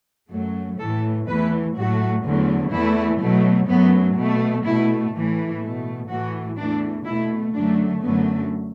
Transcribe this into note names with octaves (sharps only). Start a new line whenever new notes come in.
F#2 F#3 A3
A2 E3 A3 A4
E2 E3 A3 B4
A2 F#3 A3 F#4
E2 D3 F#3 A3
E2 E3 A3 E4
B2 F#3 A3
F#2 F#3 A3 B3
B2 A3
B2 A3 E4
A2 E3 A3
B2 A3
A2 E3 A3 F#4
E2 E3 A3 D4
B2 A3 E4
F#2 D3 F#3 A3 D4
F#2 D3 F#3 A3 B3